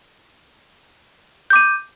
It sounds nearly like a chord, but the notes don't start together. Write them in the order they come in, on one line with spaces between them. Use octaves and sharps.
G6 D6 D#7